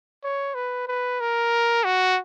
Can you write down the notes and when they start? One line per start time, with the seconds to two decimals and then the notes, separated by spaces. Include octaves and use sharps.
0.23 C#5
0.55 B4
0.87 B4
1.20 A#4
1.84 F#4